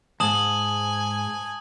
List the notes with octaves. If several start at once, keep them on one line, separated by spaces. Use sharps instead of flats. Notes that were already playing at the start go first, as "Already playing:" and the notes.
D#2 G#2 G#5 A5 D#6 F#7